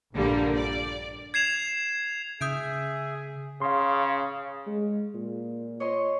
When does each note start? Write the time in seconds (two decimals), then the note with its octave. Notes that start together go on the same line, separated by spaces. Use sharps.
0.15 A#1 G2 A#2 D3 G3 A#3
0.56 D5
1.34 G#6 C7 E7 F7
2.41 C#3 G#4 E5 D#6 G6 D7
3.62 C#3 F5 C6
4.67 G#3
5.14 A#2
5.80 C#5 D#5 C6